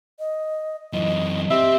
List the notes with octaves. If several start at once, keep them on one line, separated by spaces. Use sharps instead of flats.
D#5
F#2 E3 D#5
C4 G4 E5